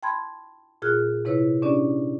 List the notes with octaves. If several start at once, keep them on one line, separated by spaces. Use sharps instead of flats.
G5 A5 B5 C6 G#6
A#2 F4 G#4 F6 F#6
C3 E4 B4 C#5
C#4 D4 G4 D5